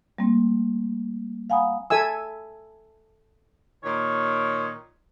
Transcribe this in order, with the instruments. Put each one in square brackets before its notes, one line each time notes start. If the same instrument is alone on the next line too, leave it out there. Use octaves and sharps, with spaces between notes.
[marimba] G3 A3 A#3 C4
F5 F#5 G#5 A#5 B5 D#6
[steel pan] A4 E5 G#5 E6
[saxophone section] A#2 D#3 C#5